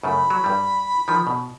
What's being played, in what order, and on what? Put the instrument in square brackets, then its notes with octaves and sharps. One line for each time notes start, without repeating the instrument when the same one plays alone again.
[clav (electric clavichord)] F#2 C#3 A3 [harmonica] B5
[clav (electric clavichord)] F#3
G2 G3
D#3 F3
B2